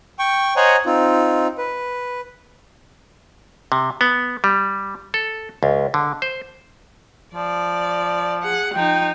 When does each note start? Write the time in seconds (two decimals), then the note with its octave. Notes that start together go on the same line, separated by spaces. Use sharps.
0.19 G5 C#6
0.56 C5 C#5 D#5 F#5 G#5 A#5
0.86 C4 D#4 F4
1.58 B4
3.72 C3
4.01 B3
4.44 G3
5.14 A4
5.63 C#2
5.94 D3
6.22 C5
7.34 F3 D5
8.43 G#4 F#5
8.74 F3 D#4 G5